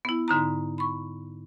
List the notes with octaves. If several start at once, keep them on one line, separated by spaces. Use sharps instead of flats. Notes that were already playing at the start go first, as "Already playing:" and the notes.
B3 E4
G#2 D3 D#4 A#5
B5 C#6